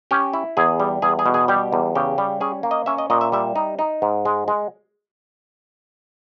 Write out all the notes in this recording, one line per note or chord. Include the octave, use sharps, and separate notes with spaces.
C#4 G4
E4
E2 G#4
G3
E2 G#4
G#4
B2
G#4
G3 G4
E2
C#3 G4
G3
C#4 G#4
A#3
D#5
C#4 E5
D#5
A#2 D#5
E5
G3 E5
D#4
D#4
G#2
G#3
G#3